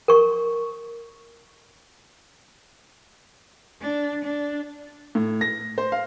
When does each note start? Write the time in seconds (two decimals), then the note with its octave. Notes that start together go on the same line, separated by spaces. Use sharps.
0.08 A#4 C#6
3.81 D4
4.24 D4
5.15 A2
5.41 A#6
5.78 C5
5.92 F5